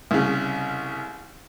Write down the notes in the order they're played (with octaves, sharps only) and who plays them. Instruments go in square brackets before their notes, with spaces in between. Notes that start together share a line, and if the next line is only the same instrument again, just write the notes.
[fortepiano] C2 C#3